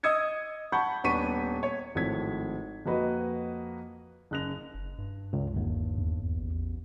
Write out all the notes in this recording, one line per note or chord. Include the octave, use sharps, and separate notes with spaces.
D#5 D#6 E6 G#6 C#7
F#5 A5 B5 C#6 G6
D#1 B3 D4 C#6 B6 D#7
C#5
G#1 A2 F3 C4 G#6 B6
F2 A#3 F#4 B4 D#5
F#1 C#3 F#6 A#6 F7
F#1
G2
C#2
G1 D#2
E2
A1